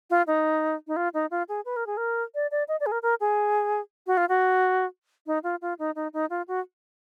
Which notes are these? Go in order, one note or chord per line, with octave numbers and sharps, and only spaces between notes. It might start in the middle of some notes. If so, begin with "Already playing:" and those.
F4
D#4
D#4
F4
D#4
F4
G#4
B4
A#4
G#4
A#4
D5
D5
D#5
D5
G#4
A#4
A#4
G#4
F#4
F4
F#4
D#4
F4
F4
D#4
D#4
D#4
F4
F#4